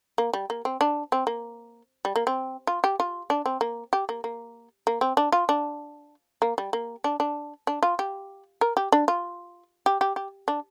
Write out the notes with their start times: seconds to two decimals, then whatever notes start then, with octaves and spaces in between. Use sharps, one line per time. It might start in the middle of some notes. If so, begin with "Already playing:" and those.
0.18 A#3
0.34 G3
0.50 A#3
0.65 C4
0.81 D4
1.12 C4
1.27 A#3
2.05 G3
2.16 A#3
2.27 C4
2.67 F4
2.84 G4
3.00 F4
3.30 D4
3.46 C4
3.61 A#3
3.93 G4
4.09 A#3
4.24 A#3
4.87 A#3
5.01 C4
5.17 D4
5.32 F4
5.49 D4
6.42 A#3
6.58 G3
6.73 A#3
7.04 D4
7.20 D4
7.67 D4
7.83 F4
7.99 G4
8.61 A#4
8.77 G4
8.92 D4
9.08 F4
9.86 G4
10.01 G4
10.16 G4
10.48 D4